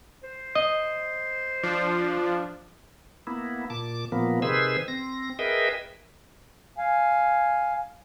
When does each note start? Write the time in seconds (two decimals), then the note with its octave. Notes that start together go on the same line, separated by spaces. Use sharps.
0.23 C5
0.55 D#5
1.63 F3 D4
3.27 A#3 B3 E4
3.70 A#2 A5 D6
4.12 A#2 F3 A#3 B3
4.42 C3 D#3 G#4 B4 C5 E6
4.88 C4 A#6
5.39 G#4 A#4 B4 D#5 E5 G5
6.78 F5 G#5